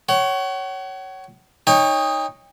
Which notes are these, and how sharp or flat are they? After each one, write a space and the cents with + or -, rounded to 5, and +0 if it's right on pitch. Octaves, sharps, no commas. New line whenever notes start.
C#5 +0 F#5 +40
D#4 +0 C#5 +0 G5 +40